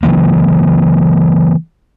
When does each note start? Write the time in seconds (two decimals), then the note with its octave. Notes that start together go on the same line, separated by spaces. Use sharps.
0.03 C#3 E3 F#3 A#3